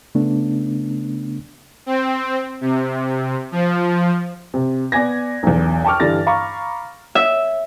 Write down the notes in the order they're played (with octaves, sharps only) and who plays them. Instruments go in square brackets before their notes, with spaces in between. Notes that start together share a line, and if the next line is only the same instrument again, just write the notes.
[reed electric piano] C#3 A3 B3 D4
[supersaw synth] C4
C3
F3
[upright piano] C3
B3 D5 G#5 G#6 A#6
B1 E2
G5 A5 C#6 D6 F6
G2 D3 E3 G3 A6 A#6
F5 A#5 B5 C#6 D6
[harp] E5